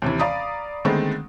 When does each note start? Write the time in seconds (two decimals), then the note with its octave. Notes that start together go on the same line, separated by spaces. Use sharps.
0.02 D#2 C3 E3
0.19 D5 F5 A#5 B5 D#6
0.85 D3 D#3 G#3 A3 B3 C4